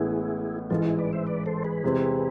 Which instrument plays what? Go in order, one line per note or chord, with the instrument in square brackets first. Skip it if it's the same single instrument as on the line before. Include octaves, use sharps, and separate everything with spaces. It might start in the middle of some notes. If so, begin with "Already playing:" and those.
Already playing: [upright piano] A1 A2 G#3 B3 [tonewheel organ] E4 G#4
[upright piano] A1 G#2 E3 G#3 [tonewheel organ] F4 A4
[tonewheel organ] E4 G#4
B4 D5
C5 E5
B4 D5
A4 C5
G#4 B4
[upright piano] E2 C3 G#3 C4